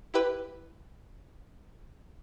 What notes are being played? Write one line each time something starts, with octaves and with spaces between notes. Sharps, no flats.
E4 G4 B4